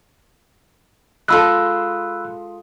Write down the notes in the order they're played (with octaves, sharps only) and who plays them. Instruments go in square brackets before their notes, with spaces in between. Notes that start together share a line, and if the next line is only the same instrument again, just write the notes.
[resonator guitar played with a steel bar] G#3 F4 A4 [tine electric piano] B5 E6 F#6